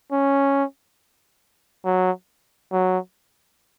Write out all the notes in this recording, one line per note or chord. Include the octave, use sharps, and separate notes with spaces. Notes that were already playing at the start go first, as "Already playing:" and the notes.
C#4
F#3
F#3